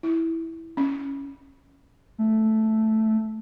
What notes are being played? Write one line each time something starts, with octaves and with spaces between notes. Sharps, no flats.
E4
C#4
A3